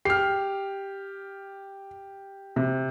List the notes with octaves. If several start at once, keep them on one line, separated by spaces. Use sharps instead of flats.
G4 F6 C7
C3